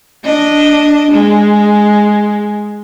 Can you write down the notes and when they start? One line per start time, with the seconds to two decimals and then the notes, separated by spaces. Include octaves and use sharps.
0.24 D4 D#5
1.11 G#3